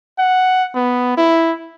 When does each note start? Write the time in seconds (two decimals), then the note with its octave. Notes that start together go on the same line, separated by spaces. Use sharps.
0.19 F#5
0.75 B3
1.17 E4